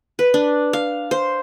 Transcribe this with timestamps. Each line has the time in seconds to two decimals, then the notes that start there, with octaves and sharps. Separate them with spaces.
0.19 B4
0.34 D4
0.73 F5
1.11 C5